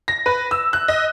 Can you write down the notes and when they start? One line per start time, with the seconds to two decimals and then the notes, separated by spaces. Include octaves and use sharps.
0.08 A#6
0.26 B4
0.51 E6
0.73 F#6
0.88 D#5